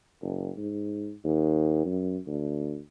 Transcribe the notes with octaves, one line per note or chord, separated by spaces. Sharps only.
F#1
G#2
D#2
F#2
D2